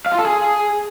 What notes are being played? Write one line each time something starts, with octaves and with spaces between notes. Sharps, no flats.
F5
F4
A4
G#4